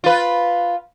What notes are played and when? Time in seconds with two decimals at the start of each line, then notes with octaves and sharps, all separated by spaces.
0.04 F4 B4